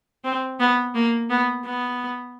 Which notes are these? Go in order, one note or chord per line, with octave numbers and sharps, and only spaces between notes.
C4
B3
A#3
B3
B3